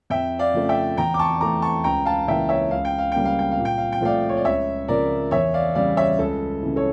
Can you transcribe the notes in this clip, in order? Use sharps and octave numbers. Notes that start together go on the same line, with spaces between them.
F2 E5 G5
D5 F5
C#3 F3 A3
E5 G5
E2 G5 A#5
D6
A5 C#6
E3 A3 A#5 D6
A5 C#6
C#2 G5 A#5
F5 A5
C#3 E3 A#3 E5 G5
C#5 E5
C#2 F5
G5
F5
C#3 G3 A#3 G5
F5
G5
F5
A#2
G5
F5
G5
F3 A3 D5 F5
C#5
D5
C#2 C#5 E5
C#3 F3 A#4 D5
E2 C#5 E5
D5 F5
C#3 G3 D5 F5
C#5 E5
C#2 A4
C#3 E3
A4 C#5